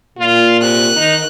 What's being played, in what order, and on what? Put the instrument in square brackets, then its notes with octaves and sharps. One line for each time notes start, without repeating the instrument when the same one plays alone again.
[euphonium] A#2 [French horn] F4
[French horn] C3 [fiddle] F#6
[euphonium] D#3 [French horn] D#4